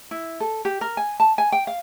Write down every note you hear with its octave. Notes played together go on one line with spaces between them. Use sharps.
E4
A4
G4
A#4
G#5
A5
G#5
G5
F5